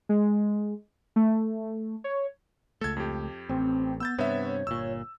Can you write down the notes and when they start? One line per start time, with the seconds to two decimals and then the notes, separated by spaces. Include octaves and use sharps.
0.09 G#3
1.16 A3
2.04 C#5
2.81 C#2 A3 A4 G#6
2.97 F2 G4
3.49 A1 C4
4.00 B3 E6 G6 A6
4.18 G2 C3 B3 C#5 E5
4.67 G1 A#2 E6